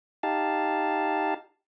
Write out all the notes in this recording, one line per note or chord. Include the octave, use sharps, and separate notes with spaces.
D#4 G4 F5 A5